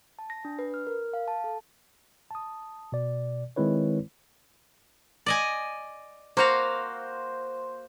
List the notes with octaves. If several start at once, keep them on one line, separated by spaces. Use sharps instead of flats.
A5
A#6
D4
B4
F6
A#4
F5
A5
A4
A5 D#6
B2 D5
D#3 G#3 C4 E4 B4 C#5
D5 D#5 G#5
A#3 F#4 C5 F5